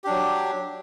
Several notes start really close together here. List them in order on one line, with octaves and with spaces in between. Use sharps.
G4 D4 F#3